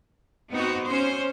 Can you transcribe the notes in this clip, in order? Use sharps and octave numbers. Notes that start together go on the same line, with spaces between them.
B3 C4 D#4 F#4
C#4 C5